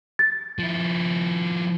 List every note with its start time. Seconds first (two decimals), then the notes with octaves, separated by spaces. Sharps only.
0.19 A6
0.59 F3 E4